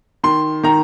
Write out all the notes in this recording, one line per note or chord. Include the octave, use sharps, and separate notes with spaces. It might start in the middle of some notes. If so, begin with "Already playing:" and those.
D#3 C6
D#3 A#5